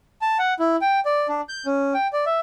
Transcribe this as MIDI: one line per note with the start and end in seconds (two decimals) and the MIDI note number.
0.22 0.38 81
0.39 0.54 78
0.59 0.76 64
0.81 1.00 79
1.05 1.27 74
1.29 1.41 62
1.49 1.66 91
1.66 1.94 61
1.94 2.07 79
2.13 2.25 74
2.26 2.40 76